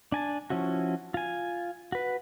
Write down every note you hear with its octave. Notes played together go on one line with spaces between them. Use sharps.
D4 G#5 A5
F3 C#4 E4 F#4
F4 G#5
F#4 B4